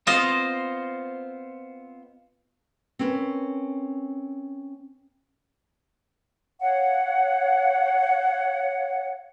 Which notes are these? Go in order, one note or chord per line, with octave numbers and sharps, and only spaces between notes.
B3 C4 F4 C5 D#5
C4 C#4 A#4 B4
C#5 F5 F#5